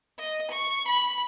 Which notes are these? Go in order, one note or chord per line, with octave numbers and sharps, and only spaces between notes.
D#5
C#6
B5